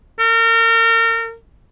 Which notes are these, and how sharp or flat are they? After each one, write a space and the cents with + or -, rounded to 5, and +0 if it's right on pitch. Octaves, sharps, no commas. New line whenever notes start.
A#4 -35